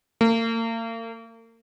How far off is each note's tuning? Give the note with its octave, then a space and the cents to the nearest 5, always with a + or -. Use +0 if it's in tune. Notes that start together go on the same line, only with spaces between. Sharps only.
A#3 -40